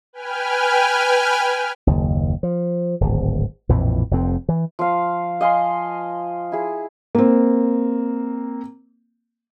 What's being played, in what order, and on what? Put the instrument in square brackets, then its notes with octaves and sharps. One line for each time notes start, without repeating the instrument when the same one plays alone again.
[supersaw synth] B4 G5 G#5 F6
[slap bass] F#1 D#2
F3
D1 G#1
A#1 F2 A2 E3
F1 F2 C4
E3
[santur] F3 F5
D#5 F5 G#5 C6
E4 G#4
[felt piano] A#3 C4